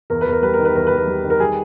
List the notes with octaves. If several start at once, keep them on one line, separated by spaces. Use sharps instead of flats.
E2 A#4
B4
E2
A#4
G3 B4
A#4
D#3
B4
E2 A#4
B4
E2
A#4
G3
D#3
A#4
G3 G#4